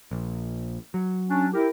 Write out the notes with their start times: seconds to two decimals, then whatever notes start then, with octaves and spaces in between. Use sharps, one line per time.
0.11 A#1
0.94 F#3
1.30 C#4 D4
1.54 E4 G4 A#4